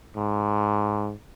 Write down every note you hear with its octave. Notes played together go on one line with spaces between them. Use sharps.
G#2